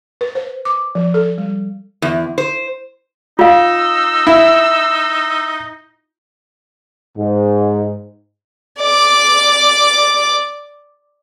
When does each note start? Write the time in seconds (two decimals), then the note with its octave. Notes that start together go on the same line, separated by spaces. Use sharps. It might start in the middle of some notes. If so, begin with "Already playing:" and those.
0.21 B4
0.35 C5
0.65 D6
0.95 F3
1.14 A4
1.38 G3
2.02 E2
2.38 C5
3.39 D#4 F4 F5 E6
4.27 E4
7.16 G#2
8.79 D5 D6